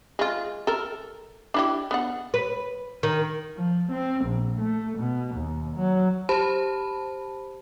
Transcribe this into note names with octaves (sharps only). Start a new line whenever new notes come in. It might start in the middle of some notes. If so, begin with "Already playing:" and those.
G#3 F4
A4 A#4
D4 E4 G4
B3 D4 F#5
B4
D#3
F3
C4
A#1
A3
B2
D#2
F#3
G4 C5 A5 B5